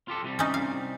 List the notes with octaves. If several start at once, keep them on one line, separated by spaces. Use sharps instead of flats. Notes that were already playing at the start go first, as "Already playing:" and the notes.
F4 G4 A4
C2 C3 G3
C#4 D#4
F5